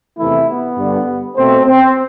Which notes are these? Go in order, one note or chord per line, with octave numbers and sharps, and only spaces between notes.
E2 C3 E3 A3 E4
B3
G2 D3 G3
B2 A3 C4
C4